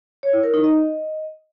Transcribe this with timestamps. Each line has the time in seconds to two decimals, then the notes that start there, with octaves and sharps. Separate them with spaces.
0.23 C#5
0.33 E4
0.43 A#4
0.54 D#4
0.64 D#5